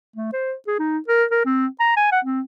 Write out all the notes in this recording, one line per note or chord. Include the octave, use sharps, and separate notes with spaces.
A3
C5
G#4
D#4
A#4
A#4
C4
A#5
G#5
F#5
C4